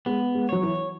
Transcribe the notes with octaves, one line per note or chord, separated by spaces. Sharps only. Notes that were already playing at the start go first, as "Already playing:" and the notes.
G#3 B3
G#3
F#3 C#5
E3